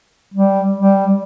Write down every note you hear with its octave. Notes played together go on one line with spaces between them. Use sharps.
G3
G3